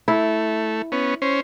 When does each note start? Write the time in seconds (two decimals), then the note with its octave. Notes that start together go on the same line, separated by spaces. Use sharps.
0.08 A3 E4
0.92 B3 C#4
1.22 C#4 C5